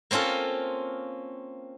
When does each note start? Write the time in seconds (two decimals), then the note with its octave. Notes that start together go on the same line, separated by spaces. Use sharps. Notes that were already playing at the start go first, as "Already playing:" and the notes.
0.11 A#3 C4 C#4 F4 A4